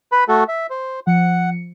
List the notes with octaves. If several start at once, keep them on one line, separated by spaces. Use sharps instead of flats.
B4 B5
A3 F#4 A4
E5
C5
F3 F#5 C#7